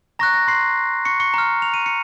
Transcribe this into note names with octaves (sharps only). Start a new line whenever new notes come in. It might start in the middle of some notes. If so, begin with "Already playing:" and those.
A#5 C#6 F#6 A#6
A#6
C6 C7
C#6 C#7
C#6 C#7
A#5 F6
F7
D#7
C#7